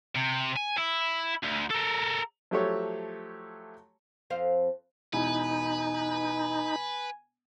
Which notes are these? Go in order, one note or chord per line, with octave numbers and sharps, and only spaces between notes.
C3
G#5
E4
D2
A4 A#4
F3 F#3 A3 G4 A4 C#5
F2 C5 F5
E1 D#4 E4 B4 G#5